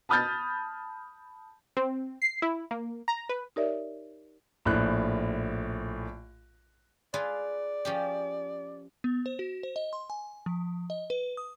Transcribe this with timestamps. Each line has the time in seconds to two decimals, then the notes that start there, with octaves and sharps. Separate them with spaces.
0.09 A5 B5 D#6 F6 G6 A6
1.77 C4
2.22 C7
2.42 E4
2.71 A#3
3.08 A#5
3.29 B4
3.56 D#4 G4 A#4 C#5 D5 E5
4.65 A#1 A2 F#6
7.14 F4 G#4 B4 D5
7.85 F3 C#4 G4
9.04 B3
9.26 C5
9.39 F#4
9.63 C5
9.76 D#5
9.93 C6
10.10 G#5
10.46 F3
10.90 D#5
11.10 B4
11.37 D#6